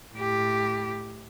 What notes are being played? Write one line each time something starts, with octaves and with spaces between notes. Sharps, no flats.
A2 G4